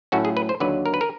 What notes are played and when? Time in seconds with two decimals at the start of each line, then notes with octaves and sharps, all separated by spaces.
0.12 A2 F#3 A3 C#4 F#4
0.25 G#4
0.37 B4
0.49 C5
0.60 D#2 D3 F#3 B4
0.86 A#4
0.94 B4
1.01 A#4